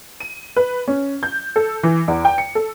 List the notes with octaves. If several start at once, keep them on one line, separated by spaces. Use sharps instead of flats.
D#7
B4
C#4
G6
A4
E3
E2
G5
C#7
A4